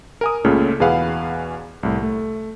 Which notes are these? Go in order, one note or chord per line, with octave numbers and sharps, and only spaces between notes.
A#4 G#5 D#6
C#2 A#2 C#3 A3 A4 F6
E2 B2 G#4 B4 F5 F#5
C2 A2
A3